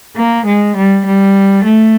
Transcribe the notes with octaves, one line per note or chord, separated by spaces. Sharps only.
A#3
G#3
G3
G3
A3